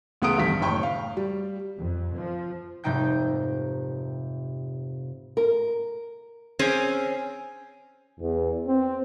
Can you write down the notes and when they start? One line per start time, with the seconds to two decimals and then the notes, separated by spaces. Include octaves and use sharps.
0.22 C#2 A3 B3 G#4 D#6 D7
0.38 A1 G2 D#3 B6
0.61 F#1 A2 G5 B5 C#6
0.83 F5
1.17 G3
1.79 F2
2.17 F3
2.84 F1 G#2 C3 D#4 G5 G6
5.37 A#4
6.59 C4 C#4 G#4
8.20 E2
8.67 C4